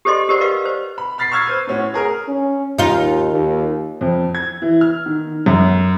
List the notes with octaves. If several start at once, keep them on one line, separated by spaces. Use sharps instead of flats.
G4 A4 C5 D5 D#5 C6
G4 A#4 C5 D5 F#5
G4 A#4 B4 D5 D#5 F5
C5
B5
B5 F6 A6 B6 C7
C#6 E6 F6 G#6 A6 C7
B4 C5
A2 C#4 F#4
G#4 A#4 F6
C#4
D#2 D#4 F4
D#2
F2
G#6
E3
F6
D#3
F#2